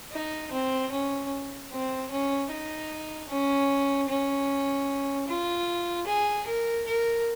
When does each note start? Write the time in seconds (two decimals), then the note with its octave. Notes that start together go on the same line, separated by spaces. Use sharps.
0.13 D#4
0.52 C4
0.92 C#4
1.72 C4
2.11 C#4
2.51 D#4
3.29 C#4
4.09 C#4
5.28 F4
6.07 G#4
6.47 A#4
6.87 A#4